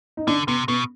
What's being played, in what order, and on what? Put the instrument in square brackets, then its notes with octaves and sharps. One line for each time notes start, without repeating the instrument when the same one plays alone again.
[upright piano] D#4
[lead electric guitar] D3 [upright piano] D4
[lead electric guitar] C3 [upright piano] B3
[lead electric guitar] B2 [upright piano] B3